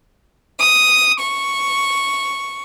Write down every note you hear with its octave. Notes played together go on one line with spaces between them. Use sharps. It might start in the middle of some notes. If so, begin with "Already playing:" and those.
D#6
C#6